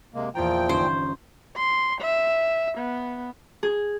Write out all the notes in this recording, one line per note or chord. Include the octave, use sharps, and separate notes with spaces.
C3 G#3 A#3
E2 A#2 F3 F4 G5 A#5
G1 C#4 D#4 C5
C6
E5
B3
G#4